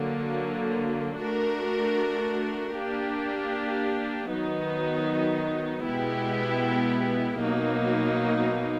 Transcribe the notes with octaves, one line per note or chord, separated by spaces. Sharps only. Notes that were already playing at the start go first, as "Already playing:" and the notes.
Already playing: D3 F#3 A#3
A3 D4 F#4 A#4
A#3 D4 G4
D#3 F#3 B3 D#4
B2 G#3 B3 E4 G4
B2 F#3 A#3 D#4